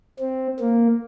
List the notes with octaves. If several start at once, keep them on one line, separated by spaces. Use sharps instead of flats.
C4
A#3